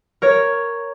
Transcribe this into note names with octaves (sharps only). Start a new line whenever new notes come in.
A#4 C#5